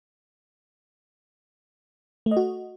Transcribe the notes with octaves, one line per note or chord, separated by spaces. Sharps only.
A3
D#5
F#4